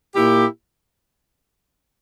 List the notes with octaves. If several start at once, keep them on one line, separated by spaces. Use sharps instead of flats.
A#2 A#3 E4 G4